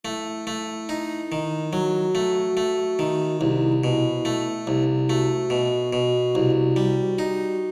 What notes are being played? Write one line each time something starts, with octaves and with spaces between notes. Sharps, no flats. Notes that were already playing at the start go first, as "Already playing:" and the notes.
A3 E4
A3
D#4
D#3
F#3 F#4
A3
A3
D#3
C2 E4
B2
A3
C2
A3 F#4
B2
B2
C2
G3
D#4